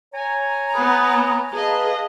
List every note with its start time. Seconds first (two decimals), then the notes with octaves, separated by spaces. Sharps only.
0.14 C#5 G#5 A#5
0.74 B3 B4 F#5 B5 D#6
1.53 G#4 B4 D#5 F5 A5